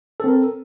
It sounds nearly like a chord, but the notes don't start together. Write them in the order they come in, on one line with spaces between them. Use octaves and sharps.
A4 C4 A#4